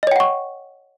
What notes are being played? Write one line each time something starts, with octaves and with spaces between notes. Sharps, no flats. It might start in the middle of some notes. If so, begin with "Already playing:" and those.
C#5 D#5 F#5 G5 C#6